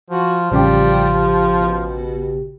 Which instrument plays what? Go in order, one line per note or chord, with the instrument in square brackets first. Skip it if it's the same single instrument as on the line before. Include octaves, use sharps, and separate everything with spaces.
[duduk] F3 [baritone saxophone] F#4
[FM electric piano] A1 C#3 G4 [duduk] F3 [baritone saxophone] G3
[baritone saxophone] B2